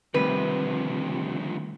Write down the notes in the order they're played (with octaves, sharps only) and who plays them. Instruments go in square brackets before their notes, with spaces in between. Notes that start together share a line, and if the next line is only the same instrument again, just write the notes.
[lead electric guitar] D2 F3 [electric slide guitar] C3 [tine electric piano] D#3 G3 A3 [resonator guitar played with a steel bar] B4